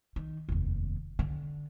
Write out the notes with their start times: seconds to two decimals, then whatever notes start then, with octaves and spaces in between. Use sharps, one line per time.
0.16 D#3
0.49 F1 D#2
1.19 D3